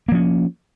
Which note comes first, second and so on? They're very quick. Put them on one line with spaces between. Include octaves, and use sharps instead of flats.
A#3 F3 C#4